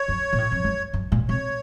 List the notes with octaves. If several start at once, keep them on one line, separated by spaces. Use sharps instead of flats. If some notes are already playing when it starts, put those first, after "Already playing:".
Already playing: C#5
F#2
A#2
A2
F2
F#2
F#2
A#2
C3 C#5